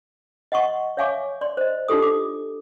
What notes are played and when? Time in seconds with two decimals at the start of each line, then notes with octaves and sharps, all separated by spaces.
0.52 D#5 F#5 C6 C#6
0.97 C#5 E5 F5 G#5 C#6 D6
1.41 D5 C6
1.57 C5 D#5
1.88 D4 D#4 F4 G4 A4 D#6
2.02 D6